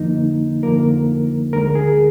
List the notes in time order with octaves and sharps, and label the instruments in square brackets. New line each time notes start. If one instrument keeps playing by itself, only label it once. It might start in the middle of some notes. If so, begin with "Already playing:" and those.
Already playing: [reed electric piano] F2 D3 F3 A#3 D#4
F2 D3 F3 A#3 A#4
D2 D3 G#3 A#4
G#4